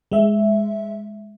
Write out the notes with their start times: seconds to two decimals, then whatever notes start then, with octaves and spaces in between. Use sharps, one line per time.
0.12 G#3 E5